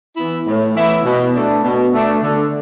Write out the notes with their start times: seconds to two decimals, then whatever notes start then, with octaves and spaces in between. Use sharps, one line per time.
0.17 E3 B3 E4
0.46 A2
0.76 E3 B3 E4
1.04 B2
1.35 A3 D4
1.64 B2
1.94 A3 D4
2.23 D3